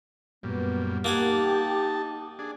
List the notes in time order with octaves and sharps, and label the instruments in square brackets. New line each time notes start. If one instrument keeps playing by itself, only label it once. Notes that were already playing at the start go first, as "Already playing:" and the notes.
[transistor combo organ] F#2 A#2 G3 [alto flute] B3
[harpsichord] A#3 F#5 G#5 [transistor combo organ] D#4 A5 [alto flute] G4
[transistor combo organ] D4 G#4